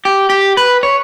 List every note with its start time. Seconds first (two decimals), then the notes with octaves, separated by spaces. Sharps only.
0.05 G4
0.30 G4
0.57 B4
0.83 C#5